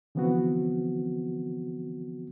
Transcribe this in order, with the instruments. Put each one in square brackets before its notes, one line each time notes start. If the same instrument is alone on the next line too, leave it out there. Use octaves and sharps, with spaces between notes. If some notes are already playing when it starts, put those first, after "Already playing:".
[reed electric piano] D3 E3 F3 B3 C4 F#4